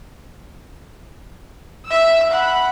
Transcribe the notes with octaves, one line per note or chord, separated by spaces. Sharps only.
E5 E6
F#5 B5